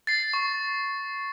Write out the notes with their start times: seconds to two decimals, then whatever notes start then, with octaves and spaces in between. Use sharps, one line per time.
0.07 A6 C7
0.33 C#6